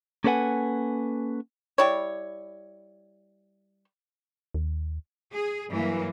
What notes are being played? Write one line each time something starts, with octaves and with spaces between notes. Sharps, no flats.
A#3 C#4 A4 B4 F#5 G#5
G3 E4 C#5
D#2
G#4
G2 E3 F#3 A#3